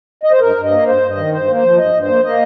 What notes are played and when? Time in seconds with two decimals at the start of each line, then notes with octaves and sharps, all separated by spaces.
0.23 D#5
0.31 C5
0.40 G2 A#4
0.56 G2
0.63 D#5
0.71 A#3
0.86 G2 C5
1.02 G2
1.09 D#5
1.17 D#3
1.32 G2 C5
1.47 A#3
1.55 C5
1.63 F3
1.78 G2 D#5
1.93 G2
2.01 C5
2.08 A#3
2.24 A#3 D#5